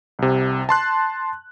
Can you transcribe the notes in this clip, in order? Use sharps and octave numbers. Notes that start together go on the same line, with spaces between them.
C2 C3
A5 C6 F#6